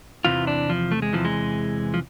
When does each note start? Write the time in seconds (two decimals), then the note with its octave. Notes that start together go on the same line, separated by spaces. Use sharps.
0.25 E2 C3 E3 F4
0.47 D4
0.69 F3
0.91 A3
1.02 G#3
1.13 E2 C3 E3 F3
1.25 G#3
1.94 F3